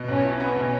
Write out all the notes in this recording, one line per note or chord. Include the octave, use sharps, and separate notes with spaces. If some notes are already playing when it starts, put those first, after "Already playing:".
Already playing: B2 B3
B1 C#4
E4
B3 C#4
B2